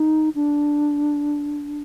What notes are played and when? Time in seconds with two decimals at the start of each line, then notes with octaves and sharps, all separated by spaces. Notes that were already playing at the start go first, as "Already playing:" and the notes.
Already playing: D#4
0.35 D4